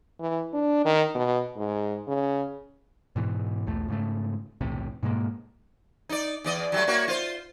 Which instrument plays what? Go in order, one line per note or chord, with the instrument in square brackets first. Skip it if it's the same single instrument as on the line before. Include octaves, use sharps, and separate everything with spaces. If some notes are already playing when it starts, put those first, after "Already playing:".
[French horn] E3
D4
D#3
B2
G#2
C#3
[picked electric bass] G#2 B2 E3
B1 E2 A3
G#2 C#3 A3
B1 E2 A2 C3
G#2 B2 G#3 A#3
[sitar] D#4 D5
E2 D5 D#5
F#3 G3 A3
A#3 F#4 C#5
F4 C5